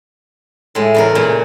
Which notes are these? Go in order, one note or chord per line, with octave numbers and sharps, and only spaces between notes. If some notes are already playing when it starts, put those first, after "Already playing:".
A2 G#3
E2 C#3 A#4
A#2 C#3